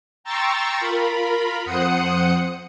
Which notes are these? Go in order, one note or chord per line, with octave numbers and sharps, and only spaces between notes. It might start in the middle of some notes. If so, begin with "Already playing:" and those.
G5 A#5 C6 C#6 E6 A6
F4 A#4 B5
F2 C5 F#5 D#6 C#7